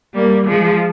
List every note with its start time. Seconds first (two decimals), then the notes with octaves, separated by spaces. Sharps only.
0.16 G3 A#3
0.47 F3 G#3